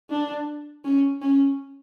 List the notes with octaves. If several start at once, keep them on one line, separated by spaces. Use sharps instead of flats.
D4
C#4
C#4